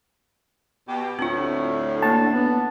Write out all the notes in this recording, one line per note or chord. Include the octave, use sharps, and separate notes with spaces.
B2 G4
D2 A2 C4 D4 F4
A#3 D4 E4 A5
B3